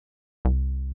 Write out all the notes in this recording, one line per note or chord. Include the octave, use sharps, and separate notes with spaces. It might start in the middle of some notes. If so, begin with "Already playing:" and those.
C2